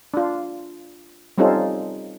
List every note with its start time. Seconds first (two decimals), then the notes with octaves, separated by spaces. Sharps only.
0.14 D4 F4
1.38 G3 C4 C#4 D#4 F4 A4